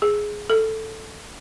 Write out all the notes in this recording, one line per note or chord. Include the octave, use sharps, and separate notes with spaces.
G#4
A4